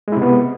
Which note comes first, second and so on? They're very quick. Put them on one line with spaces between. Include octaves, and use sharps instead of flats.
G#3 E4 C3 B3